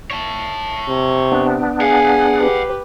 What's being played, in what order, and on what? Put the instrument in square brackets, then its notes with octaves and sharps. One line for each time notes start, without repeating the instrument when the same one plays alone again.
[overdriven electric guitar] C#5 A5
[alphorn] C3
[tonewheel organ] B3 D4
[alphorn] G#4 [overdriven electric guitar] F5 F#5 [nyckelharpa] G#5
[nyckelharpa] G4 B4